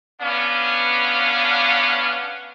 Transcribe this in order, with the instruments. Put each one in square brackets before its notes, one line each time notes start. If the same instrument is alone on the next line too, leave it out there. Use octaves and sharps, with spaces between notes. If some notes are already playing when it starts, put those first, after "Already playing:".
[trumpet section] B3 C#4 D4 F5